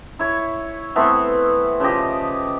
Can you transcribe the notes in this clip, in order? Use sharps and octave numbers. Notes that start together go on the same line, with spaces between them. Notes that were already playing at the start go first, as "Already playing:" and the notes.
E4 C#5
E3 A3 B3 C4
C#3 F3 G4 D#5